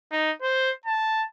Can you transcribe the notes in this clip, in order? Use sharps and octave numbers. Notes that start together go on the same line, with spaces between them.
D#4
C5
A5